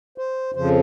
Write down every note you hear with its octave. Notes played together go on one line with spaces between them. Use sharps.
C5
F2 C#3 F3 C5